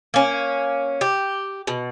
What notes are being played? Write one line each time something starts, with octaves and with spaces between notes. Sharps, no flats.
A#3 C#4
G4
B2